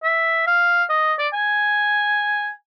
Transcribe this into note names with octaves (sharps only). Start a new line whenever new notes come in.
E5
F5
D#5
D5
G#5